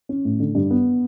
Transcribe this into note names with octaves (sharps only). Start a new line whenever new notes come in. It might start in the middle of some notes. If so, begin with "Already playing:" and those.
C#4
A2
D3
G2
B3